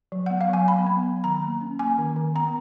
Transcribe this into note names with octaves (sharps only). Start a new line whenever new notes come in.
F#3
F#5
B3
F5
F#3 G#5
B3 B5
B3
F#3
D#3 A#5
A#3
C#4
A#3 G#5
D#3
D#3
B3 A#5